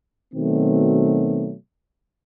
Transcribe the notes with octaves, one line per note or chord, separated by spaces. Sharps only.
B2 D#3 F#3 A3 C4